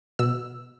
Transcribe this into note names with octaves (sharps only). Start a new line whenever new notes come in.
B2 E6